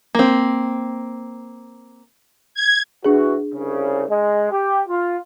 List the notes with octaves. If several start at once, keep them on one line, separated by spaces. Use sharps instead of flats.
A#3 C4
G#6
E3 D4 F#4 G#4
C2 C#3
G#3
G4
F4